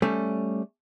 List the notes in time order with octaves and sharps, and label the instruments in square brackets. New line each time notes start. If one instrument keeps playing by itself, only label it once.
[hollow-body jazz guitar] G3 A3 C#4